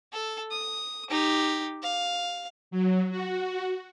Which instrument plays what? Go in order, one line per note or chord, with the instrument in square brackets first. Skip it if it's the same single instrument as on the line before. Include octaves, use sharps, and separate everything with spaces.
[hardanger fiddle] A4
D#6
D#4 G4
F5
[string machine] F#3
F#4